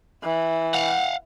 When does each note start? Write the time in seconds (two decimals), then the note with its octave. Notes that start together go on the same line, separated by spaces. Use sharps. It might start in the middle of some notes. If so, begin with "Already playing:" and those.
0.24 E3
0.74 F5 F#5